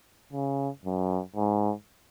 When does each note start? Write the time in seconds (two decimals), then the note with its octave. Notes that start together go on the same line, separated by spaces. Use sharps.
0.33 C#3
0.85 F#2
1.36 G#2